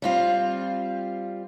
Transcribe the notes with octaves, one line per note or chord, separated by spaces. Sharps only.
G3 C4 F4